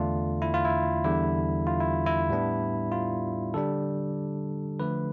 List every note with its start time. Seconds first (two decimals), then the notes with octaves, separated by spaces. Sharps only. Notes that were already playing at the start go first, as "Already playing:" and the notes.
Already playing: E2 D3 A3 D4 F4
0.42 E4
0.54 F4
0.65 E4
1.04 E2 D3 G3 E4
1.67 F4
1.80 E4
2.06 E4
2.29 A2 G3 B3 D4
2.92 F4
3.54 D3 G3 D4 A4
4.80 D3 F3 A3 B4